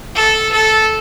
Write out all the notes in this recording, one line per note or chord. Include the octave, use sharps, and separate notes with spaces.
A4
A4